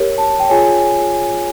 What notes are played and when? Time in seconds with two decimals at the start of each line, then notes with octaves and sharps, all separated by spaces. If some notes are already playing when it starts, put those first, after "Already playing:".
Already playing: G4 A#4 C#5
0.18 A5
0.40 G5
0.49 F4 G#4 C#5 G#5